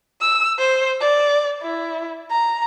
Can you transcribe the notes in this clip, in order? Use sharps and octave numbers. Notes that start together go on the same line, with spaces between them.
E6
C5
D5
E4
A#5